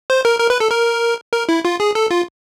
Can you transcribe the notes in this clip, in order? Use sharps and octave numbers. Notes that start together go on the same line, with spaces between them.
C5
A#4
A#4
B4
A4
A#4
A#4
E4
F4
G#4
A4
F4